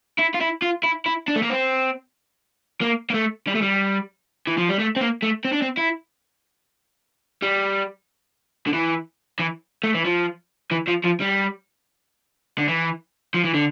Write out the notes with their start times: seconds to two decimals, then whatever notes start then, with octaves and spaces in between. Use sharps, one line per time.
0.18 E4
0.34 F4
0.41 E4
0.62 F4
0.84 E4
1.06 E4
1.28 D4
1.36 A3
1.42 A#3
1.50 C4
2.81 A#3
3.10 A#3
3.14 A3
3.47 G3
3.55 A3
3.62 G3
4.47 E3
4.58 F3
4.69 G3
4.79 A3
4.96 C4
5.01 A#3
5.23 A3
5.45 C4
5.52 D4
5.62 C4
5.77 E4
7.42 G3
8.67 D3
8.73 E3
9.39 E3
9.84 A3
9.94 E3
10.05 F3
10.71 E3
10.87 F3
11.04 F3
11.20 G3
12.58 D3
12.68 E3
13.34 F3
13.44 E3
13.54 D3